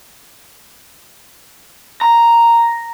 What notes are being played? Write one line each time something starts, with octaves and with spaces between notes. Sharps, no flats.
A#5